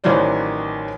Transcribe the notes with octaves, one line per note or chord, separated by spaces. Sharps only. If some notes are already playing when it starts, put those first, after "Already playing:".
A1 D#3 E3 F#3 C5 D5